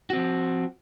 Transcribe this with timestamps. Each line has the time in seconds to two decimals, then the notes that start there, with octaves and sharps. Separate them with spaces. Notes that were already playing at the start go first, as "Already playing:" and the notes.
0.10 F#4
0.13 C4
0.17 F3